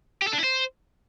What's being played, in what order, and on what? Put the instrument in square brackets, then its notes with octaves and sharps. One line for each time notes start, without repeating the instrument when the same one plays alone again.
[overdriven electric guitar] G4
A4
D4
E4
C5